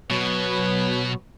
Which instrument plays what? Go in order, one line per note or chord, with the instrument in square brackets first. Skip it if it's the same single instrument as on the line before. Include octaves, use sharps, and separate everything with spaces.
[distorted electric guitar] B2 [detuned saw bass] F#3 [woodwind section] B3 B4 C#5